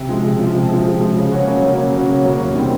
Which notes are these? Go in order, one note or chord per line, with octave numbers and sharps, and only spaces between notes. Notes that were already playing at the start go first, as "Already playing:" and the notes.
Already playing: C3
F3 G#3
C3
F3 G#3
C3
F3 G#3
C3
F3 G#3
C#3
F#3 A#3 C#4 F#4
C#3
F#3 A#3 C#4 F#4
C#3
F#3 A#3 C#4 F#4
C#3
F#3 A#3 C#4 F#4
E2
C3 D#3 G3 C4